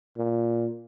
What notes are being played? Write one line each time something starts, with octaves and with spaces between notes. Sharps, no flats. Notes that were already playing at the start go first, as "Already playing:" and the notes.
A#2